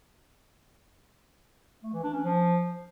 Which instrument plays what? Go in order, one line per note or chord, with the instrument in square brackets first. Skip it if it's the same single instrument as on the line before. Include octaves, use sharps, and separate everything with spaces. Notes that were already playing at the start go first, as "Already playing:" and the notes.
[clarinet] A3
E3
D4
C#4
F3